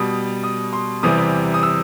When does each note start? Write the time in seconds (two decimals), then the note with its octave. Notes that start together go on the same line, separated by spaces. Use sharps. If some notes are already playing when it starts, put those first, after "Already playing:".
Already playing: B2 G3 D#6
0.43 D#6
0.73 C6
1.03 E2 C3 E3 G3 D#6
1.54 D#6
1.63 E6